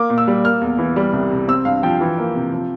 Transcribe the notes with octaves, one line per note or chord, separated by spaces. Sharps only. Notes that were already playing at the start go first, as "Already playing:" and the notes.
Already playing: A#3 D6
A#2
E6
G3
A#3 F6
E2
E3
G3
C2
C3
C4 E6
G2 F5
F3 G5
E3
A#3
C3
F3